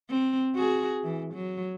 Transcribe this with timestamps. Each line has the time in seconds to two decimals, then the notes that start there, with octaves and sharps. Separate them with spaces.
0.10 C4
0.56 F#4 G#4
1.04 E3
1.34 F#3